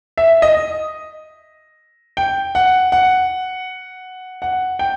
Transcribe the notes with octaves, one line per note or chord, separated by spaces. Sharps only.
E5
D#5
G5
F#5
F#5
F#5
G5